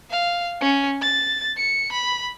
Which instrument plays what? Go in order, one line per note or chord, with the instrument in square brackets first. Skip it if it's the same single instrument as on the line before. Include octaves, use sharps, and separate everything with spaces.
[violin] F5
C#4
A6
C#7
B5